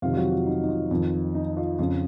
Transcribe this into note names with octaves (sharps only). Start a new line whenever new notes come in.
F2 C3 D#3 F4 F5
F4
F#3 F#4
F4
D#4
D#4
F4
F2 D#3
D#4
F4
F2 C#3 F4